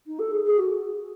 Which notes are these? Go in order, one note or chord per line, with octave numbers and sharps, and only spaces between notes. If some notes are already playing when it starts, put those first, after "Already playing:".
D#4
A4
G#4
G#4
F#4